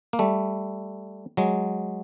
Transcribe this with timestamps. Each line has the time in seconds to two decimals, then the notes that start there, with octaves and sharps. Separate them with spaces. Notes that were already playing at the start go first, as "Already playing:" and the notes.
0.13 A#3
0.19 G3 A3
1.37 F#3 G#3